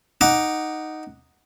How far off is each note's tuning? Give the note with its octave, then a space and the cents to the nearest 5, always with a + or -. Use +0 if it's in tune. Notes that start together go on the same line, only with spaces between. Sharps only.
D#4 +0 F#5 +0 D6 +0